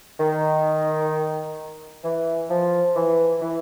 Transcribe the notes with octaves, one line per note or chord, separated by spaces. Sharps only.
D#3
E3
F3
E3
E3